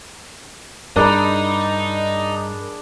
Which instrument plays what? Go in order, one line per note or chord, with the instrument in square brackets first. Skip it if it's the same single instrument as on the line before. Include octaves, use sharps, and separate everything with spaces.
[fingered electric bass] G2 [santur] D4 G#4 B5 [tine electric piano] A#4 [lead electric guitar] D#5 A#5